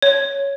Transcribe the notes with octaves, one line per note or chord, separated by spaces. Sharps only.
C#5